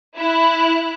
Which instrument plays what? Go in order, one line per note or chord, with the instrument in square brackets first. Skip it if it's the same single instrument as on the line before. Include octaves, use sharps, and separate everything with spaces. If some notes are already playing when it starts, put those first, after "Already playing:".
[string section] E4 F#6